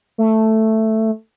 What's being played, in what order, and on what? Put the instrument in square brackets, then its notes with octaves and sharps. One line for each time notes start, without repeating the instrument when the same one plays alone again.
[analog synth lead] A3